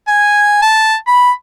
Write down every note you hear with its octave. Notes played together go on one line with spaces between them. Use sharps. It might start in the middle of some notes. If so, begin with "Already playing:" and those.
G#5
A5
B5